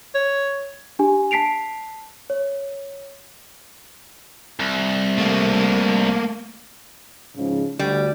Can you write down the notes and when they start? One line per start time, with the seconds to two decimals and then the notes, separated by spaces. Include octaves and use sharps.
0.14 C#5
0.99 D4 G4 G#5
1.31 A5 B6 C7 D7 F7
2.30 C#5
4.59 C2
5.18 A3 A#3
7.37 G#2 C#3 F3
7.79 D2 G3